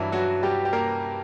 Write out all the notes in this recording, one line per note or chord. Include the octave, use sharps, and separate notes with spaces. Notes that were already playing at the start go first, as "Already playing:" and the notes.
Already playing: G2 E3 F#3 E4
F#3 F#4
G3 G4
G4
A#3 A#4